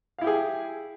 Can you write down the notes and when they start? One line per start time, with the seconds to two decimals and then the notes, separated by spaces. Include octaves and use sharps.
0.19 F5
0.21 E4
0.24 G4
0.27 G#4